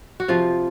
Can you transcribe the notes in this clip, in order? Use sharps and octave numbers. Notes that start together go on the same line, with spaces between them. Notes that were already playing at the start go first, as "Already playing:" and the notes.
F#4
C3 F3 F4